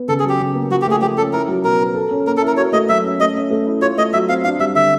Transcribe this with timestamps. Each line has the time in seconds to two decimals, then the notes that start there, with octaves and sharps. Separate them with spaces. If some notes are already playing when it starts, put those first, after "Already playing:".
Already playing: B3
0.08 C#3 A4
0.19 G#4
0.24 F#3
0.29 G4
0.40 C#3
0.55 A#3
0.71 F3 F#4
0.82 G4
0.87 A3 G#4
1.01 F3 G4
1.17 C#4 A4
1.33 E4 A#4
1.48 F#3
1.64 B2 A#4
1.80 B3
1.95 A4
2.11 C#4
2.26 A#3 A#4
2.37 A4
2.42 E4
2.47 A#4
2.57 F#4 C#5
2.73 A3 D#5
2.89 F#3 E5
3.04 C#4
3.20 A3 D#5
3.36 C#4
3.50 A3
3.67 E4
3.82 F4 C#5
3.97 A3 D#5
4.13 F#3 E5
4.29 C4 F5
4.44 D4 F5
4.60 G3 E5
4.75 D3 E5